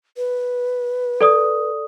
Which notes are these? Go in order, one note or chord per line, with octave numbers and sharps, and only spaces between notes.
B4
A4 D5 D#6